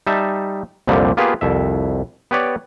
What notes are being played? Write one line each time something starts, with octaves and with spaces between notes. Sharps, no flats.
G3 D#4 E5 A5
C2 F2 A#2 D3 G3
A#3 B3 F4 G4 G#4 B4
C2 F2 E5
B3 G4 B4 C#5 D5